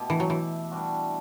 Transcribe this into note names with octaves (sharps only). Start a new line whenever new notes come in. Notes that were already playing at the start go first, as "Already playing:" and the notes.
Already playing: B2 A3 E4 G4
E3
F#3
E3
G3 D4 F#4